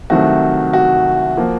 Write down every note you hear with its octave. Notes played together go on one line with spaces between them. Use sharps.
C2 C3 D#3 F#3 A3 F#4
F#4
F3 A#3